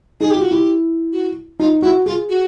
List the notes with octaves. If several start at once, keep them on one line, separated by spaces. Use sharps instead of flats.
D#4 G#4
F4 G4
F#4
E4 G4
F#4
D#4 F4
E4 F#4
F4 G#4
F#4